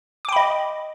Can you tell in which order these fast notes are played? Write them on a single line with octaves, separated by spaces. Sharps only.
D6 G5 B5 D#5